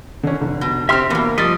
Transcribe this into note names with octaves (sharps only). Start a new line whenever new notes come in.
D3 C#4
F1 D3
B2
C4 G4 E5 C6 F6
E2 B2 A#3
F3 G3 D#5 D#6 A6 B6